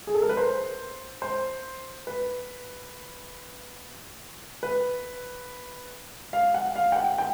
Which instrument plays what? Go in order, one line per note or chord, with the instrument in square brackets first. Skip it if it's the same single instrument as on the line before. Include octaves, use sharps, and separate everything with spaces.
[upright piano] G#4
A4
A#4
B4
C5
C5
B4
B4
F5
F#5
F5
G5
F#5
G5